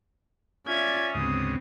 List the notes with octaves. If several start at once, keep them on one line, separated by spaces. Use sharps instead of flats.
C#4 F4 D5 E5 G#6
D2 G#2 C#3 B3 C4 D#6